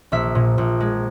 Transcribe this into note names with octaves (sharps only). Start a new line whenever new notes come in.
A#1 E5
A#2
A#1
G#3